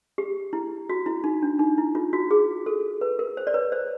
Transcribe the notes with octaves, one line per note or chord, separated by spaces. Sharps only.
G4
E4
F#4
E4
D#4
D4
D#4
E4
F4
F#4
G#4
A4
B4
A#4
C5
D5
B4 C#5
C5 D5